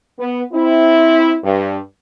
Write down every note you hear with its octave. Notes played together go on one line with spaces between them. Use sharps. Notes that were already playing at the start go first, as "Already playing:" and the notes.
B3
C4 E4
G2